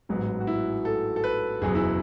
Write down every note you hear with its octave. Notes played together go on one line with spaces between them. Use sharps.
A1 G#2 F#3 B3
F#4
E4
A4
A4
B4
F#1 E2 B2 F#3 G#4
E4